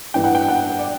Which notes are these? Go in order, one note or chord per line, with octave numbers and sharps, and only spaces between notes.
G2 E3 B3 G5
F#5
G5
F#5
D5